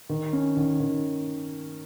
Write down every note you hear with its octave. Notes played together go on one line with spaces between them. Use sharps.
D#3
C#4
D#3
D#3